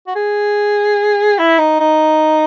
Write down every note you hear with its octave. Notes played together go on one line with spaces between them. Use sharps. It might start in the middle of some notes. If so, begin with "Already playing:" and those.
F#4
G#4
E4
D#4
D#4